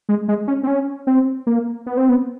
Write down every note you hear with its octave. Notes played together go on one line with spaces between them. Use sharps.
G#3
G#3
C#4
C4
C#4
C4
A#3
B3
C4
B3